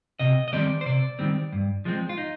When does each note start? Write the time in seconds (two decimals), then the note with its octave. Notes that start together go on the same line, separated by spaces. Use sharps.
0.20 C3 D#5
0.48 D#5
0.53 D#3 G3 C4 D5
0.81 C5
0.86 C3 D5
1.19 D#3 G3 C4
1.52 G2
1.85 F3 G#3 C4
2.09 F4
2.18 D#4